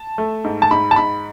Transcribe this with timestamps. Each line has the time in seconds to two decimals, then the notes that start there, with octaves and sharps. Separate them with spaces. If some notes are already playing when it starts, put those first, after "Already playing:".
Already playing: A5
0.18 A3
0.44 G#2
0.62 A5
0.71 G#2 B5
0.91 A5
0.96 G#2 B5